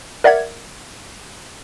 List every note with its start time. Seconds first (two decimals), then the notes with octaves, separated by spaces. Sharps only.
0.24 A#4 D5 E5 F#5 G#6